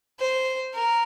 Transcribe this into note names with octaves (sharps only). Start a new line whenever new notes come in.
C5
A#4